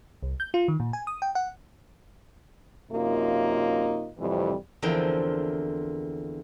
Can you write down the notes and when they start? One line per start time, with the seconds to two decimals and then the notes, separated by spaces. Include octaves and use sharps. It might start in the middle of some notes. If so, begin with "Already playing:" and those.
0.23 C2
0.40 G6
0.54 F4
0.68 D#3
0.80 A#2
0.93 G#5
1.07 D#6
1.22 G5
1.35 F#5
2.91 F#2 C3 A#3 D#4 F4
4.18 F2 A2 C3 E3 G3
4.82 E2 D3 F3 C4 A#4 G5